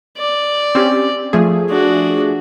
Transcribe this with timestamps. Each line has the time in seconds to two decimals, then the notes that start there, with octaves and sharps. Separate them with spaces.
0.18 D5
0.75 C4 C#4 G4
1.33 F3 A3 G#4
1.69 D4 F#4